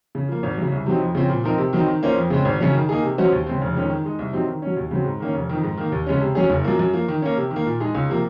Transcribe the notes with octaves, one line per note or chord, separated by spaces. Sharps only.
C#3
F3 A#3
G#1
F#2 C#3
C2
C3 F#3 C4 D#4
F2
C#3 F3 C4
A#2
F3 C4 D#4 A#4
C3
D#3 F#3 C4 D#4
D#3
A#3 C#4 F4 C5
F2
C#3 G#3 C4
G#1
F#2 C#3 F#3 C#4
D#3
A#3 D#4 G#4
C3
F#3 C#4 F#4 C5
D#2
C#3 G#3 C4
F1
F2 D#3 G#3 C#4
D#3
G#3 D#4
C2
C3 F#3 C4 D#4
D#3
F#3 C#4
D#2
C#3 F#3 C4
G#2
D#3 A#3 C#4
F1
F2 D#3
G#2
D#3 A#3
D#2
C#3 G#3 C#4
C3
F#3 C#4 G#4
F#1
F#2 F3 A#3
F#2
F3 A#3
D#3
A#3 C#4
C3
D#3
A#3
A#2
G#3 D#4 G#4
C#2
C3 F3 A#3